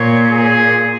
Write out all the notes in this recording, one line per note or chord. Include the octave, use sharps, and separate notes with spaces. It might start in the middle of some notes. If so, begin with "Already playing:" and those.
Already playing: A#2 C#5
G#4